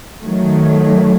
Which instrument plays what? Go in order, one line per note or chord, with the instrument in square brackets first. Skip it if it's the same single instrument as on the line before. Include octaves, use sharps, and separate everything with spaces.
[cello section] D#3 F#3 A3